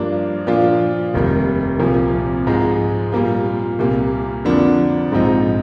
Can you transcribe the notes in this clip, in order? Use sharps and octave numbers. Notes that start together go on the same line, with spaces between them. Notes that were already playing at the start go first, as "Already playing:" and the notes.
Already playing: G2 F3 A#3 D4
A#2 F3 A#3 D4 F4
F1 D#2 D#3 G3
C2 A#2 F3 A#3
G#2 F3 G#3
A#2 G3 A#3 F4
C2 A#2 G3 A#3
F2 D3 F3 A#3 D4
A#1 G#2 F3 C4 D#4